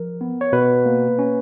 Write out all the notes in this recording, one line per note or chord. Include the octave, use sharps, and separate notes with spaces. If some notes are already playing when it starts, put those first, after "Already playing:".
Already playing: F3 A#4
B3
C#5
B2 B4
A#3
C#4